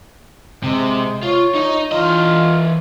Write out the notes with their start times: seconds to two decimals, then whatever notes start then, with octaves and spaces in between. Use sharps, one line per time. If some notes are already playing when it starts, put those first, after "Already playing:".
0.63 C3 G#3
1.23 F4 C#5
1.54 D#4 D#5
1.92 E3 F4 D#5